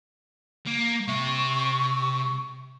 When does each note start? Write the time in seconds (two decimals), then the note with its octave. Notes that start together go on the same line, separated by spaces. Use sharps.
0.67 A#3
1.08 C3 E5 C#6